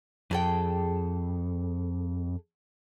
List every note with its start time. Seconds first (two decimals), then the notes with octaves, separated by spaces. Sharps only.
0.31 F2 G#4 A4 G5